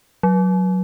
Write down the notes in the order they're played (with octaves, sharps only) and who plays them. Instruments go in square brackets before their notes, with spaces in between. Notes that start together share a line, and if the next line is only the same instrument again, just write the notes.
[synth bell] F#3